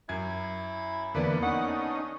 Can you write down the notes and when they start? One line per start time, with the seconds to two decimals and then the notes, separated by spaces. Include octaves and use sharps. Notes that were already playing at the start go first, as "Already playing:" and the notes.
0.09 F#2 E4 G#6
1.15 E2 D3 A#3 B3 B4 D5
1.42 C#4 D#4 F#5
1.67 D4